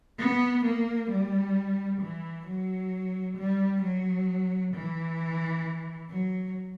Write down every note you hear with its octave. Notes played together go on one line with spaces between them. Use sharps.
B3
A#3
G3
E3
F#3
G3
F#3
E3
F#3